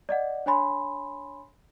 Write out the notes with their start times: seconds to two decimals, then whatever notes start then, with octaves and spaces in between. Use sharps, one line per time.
0.09 D5 D#5 F#5
0.46 D4 C#5 G#5 B5 C6